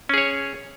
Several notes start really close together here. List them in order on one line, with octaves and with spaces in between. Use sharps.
C#4 G#4 C#5